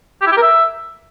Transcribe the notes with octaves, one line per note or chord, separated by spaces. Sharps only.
G4
E4
G4
A#4
E5